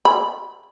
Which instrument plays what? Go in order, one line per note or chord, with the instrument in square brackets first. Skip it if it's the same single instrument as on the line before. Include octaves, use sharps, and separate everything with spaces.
[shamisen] B5